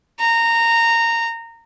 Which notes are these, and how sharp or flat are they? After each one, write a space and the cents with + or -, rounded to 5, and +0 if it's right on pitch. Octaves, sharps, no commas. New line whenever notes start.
A#5 -15